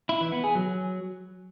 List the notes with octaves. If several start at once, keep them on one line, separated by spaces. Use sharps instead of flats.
E4
E3
B3
G#4
F#3